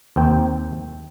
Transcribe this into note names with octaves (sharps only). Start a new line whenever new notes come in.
D#2 C4 G5